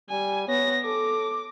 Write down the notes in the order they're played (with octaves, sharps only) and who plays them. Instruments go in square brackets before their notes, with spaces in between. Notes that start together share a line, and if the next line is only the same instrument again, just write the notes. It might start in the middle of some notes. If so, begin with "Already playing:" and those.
[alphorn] G3 [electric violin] G#5
[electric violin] B3 A#6 [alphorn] C#5
[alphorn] A4 [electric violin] D6